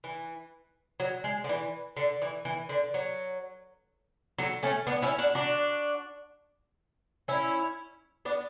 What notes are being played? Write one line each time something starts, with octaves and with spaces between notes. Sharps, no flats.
E3
F#3
G#3
D3
E3
D3
E3
E3
D3
F#3
F#3 A3
A3 C#4
B3 D4
C#4 E4
D4 F#4
D4 F#4
C#4 E4
B3 D4